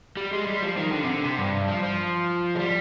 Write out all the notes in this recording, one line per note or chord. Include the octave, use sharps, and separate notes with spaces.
G3
G#3
G3
F3
D#3
D3
C3
D3
C3
G2
F3
F3
G#3
G3